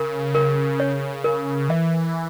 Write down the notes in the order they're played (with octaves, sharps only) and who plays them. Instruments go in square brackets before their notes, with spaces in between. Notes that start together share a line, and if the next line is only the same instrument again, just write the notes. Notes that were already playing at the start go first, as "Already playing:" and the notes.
Already playing: [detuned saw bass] C#3 [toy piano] A#4
[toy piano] A#4
C#5
A#4
[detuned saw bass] E3 [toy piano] E5